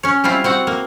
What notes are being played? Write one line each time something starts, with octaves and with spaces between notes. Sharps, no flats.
C#4 C#5
G3 C4 E4 F4
C4 F#4 F#5
A#3